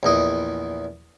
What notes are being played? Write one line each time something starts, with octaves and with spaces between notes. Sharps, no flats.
A#1 E2 D#5